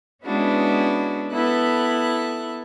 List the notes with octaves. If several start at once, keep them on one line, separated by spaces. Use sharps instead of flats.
G#3 B3 C#4 D4 E4 F#4
B3 E4 A4 F#6